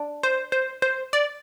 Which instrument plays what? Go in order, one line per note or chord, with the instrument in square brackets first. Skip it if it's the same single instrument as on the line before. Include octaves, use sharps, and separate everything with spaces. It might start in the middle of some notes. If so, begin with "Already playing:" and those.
Already playing: [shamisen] D4
[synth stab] C5
C5
C5
D5